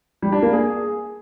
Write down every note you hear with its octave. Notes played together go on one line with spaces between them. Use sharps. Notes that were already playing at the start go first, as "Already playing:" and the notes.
G3
D4
A#3
G#4